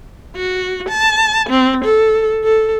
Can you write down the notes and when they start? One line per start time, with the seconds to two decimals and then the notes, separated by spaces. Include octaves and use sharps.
0.36 F#4
0.89 A5
1.50 C4
1.85 A4
2.44 A4